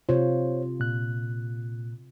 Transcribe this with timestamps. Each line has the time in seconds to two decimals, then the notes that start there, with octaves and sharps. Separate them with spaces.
0.09 C3 F4 C5 C#5
0.80 A#2 F#6